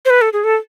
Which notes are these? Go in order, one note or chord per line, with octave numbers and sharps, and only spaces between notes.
C5
B4
A4
G#4
A4